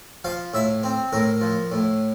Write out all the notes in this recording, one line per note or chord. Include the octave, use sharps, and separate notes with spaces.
F3 F5
A2 E5
C4
A2 A#4
F3
A2